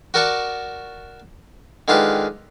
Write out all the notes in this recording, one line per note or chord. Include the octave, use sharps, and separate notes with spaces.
F#4 A#4 D5 F#5 A5 C#6
D3 D#3 G#3 F4 G4 B4